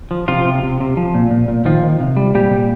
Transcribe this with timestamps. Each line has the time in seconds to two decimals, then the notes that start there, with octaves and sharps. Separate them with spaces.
0.11 F3
0.28 C3 F3 F4
0.45 C3
0.63 C3
0.80 C3
0.97 F3
1.14 A#2
1.31 A#2
1.48 A#2
1.65 D#3 F3 F4
1.83 D#3
2.00 C3
2.17 G3
2.35 A#2 G3 G4
2.51 G3